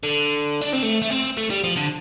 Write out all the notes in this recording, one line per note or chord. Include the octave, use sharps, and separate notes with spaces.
D3
D4
C4
A3
A3
C4
A3
G3
F3
D3